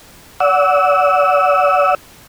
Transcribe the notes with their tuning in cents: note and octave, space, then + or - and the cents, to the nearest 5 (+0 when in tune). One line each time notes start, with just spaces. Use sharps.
D5 -35 F#5 +0 E6 -20